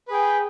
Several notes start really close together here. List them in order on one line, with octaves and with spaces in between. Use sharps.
B4 G#4 G5